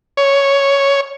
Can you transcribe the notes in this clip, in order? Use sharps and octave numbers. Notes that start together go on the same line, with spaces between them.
C#5